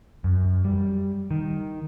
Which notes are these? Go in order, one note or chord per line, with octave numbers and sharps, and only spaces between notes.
F#2
G3
D#3